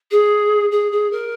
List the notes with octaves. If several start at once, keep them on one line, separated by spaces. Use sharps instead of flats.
G#4
G#4
G#4
A#4